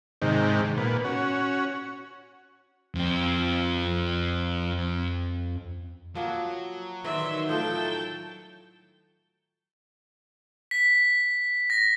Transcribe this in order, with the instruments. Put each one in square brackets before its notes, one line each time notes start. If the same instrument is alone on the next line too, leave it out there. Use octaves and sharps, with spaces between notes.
[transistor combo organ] G#2 C3 D#3
A#2 B3
C#4 F#4
[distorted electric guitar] F2 C4
[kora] F3 A#3 F#4 [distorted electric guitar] F#3
[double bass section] D#3 [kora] E3 D5 [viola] E5 C6
[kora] A2 F3 A3 [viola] G5 A5
[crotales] B6
A#6